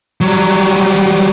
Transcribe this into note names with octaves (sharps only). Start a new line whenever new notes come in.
F#3 G3